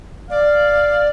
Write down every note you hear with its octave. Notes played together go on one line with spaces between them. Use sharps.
D5 F5